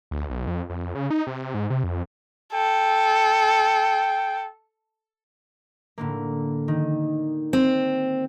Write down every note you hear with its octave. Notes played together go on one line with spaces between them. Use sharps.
D2
B1
F2
F2
C#3
D#4
C3
G#2
C3
F2
A4 G5
A2 D3 A#3
D#3
C4